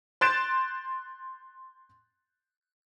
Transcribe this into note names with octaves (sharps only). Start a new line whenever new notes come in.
C6 F#6 G6 A6 D7 E7